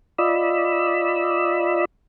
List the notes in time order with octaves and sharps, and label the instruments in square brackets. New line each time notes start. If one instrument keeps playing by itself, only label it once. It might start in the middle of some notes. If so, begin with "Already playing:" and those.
[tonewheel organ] F4 D5 D#5 B5 E6